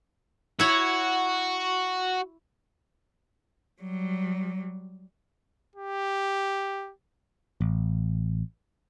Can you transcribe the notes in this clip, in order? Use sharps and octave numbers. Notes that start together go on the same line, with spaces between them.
E4 F#4 C#5
F#3 G3
G4
A1